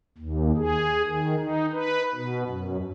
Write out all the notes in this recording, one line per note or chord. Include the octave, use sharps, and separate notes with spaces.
D#2
G#4
D#3
D#4
B4
B2
F#2